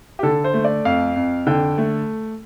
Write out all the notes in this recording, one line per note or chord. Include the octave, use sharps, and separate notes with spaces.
G4
D3 A4
C5
A3
D5
F2 F5
F2
D3 G5
A3